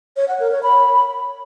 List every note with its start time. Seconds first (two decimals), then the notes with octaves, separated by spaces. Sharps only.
0.17 C#5
0.28 F#5
0.40 A#4
0.51 C#5
0.63 B5